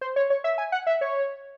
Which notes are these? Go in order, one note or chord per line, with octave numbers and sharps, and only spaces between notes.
C5
C#5
C#5
E5
G#5
F#5
E5
C#5